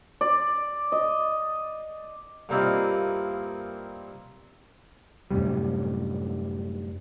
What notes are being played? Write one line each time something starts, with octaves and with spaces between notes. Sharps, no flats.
D5
D#5
G2 A#3 C4 E4 F4 D#5
F#2 A2 C3 G3